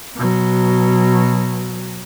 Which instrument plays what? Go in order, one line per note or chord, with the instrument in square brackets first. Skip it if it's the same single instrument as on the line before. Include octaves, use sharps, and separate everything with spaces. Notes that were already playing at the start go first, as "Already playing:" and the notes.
[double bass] B2 F#3